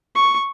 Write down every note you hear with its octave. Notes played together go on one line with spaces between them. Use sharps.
C#6